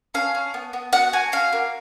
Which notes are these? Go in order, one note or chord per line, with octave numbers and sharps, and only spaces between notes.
C#4 F5
C#4
B3
B3
F#4 F#5
F#4 G#5
C#4 F5
A#3